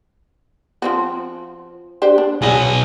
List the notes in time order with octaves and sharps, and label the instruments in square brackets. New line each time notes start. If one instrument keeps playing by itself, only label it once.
[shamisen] F3 C4 F#4
D4 G4 C5
D4
[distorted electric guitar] B1 D#5 [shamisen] C#4 F#4 G#4